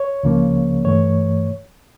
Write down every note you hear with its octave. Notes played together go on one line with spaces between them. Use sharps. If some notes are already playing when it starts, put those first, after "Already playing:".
Already playing: C#5
C#2 C#3 F3 A#3
G2 E3 A3 C#5